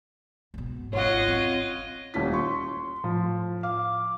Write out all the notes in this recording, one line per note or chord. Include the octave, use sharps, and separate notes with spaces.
G#2 B2
G#1 F2 F4 C#5 D#5 F#5
C4
D#1 C#4 E4 B6
C6 C#6
A2 F3
F5 D6